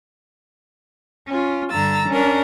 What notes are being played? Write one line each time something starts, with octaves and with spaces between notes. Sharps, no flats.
C#4 F4
G2 D3 A#5 E6 A6
C#4 D4 A#4